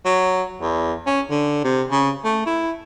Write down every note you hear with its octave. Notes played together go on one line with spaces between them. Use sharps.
F#3
E2
C#4
D3
C3
C#3
A3
E4